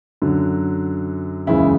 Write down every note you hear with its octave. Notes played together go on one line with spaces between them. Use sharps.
F#2 D3 F#3
F#1 E2 C#3 G#3 E4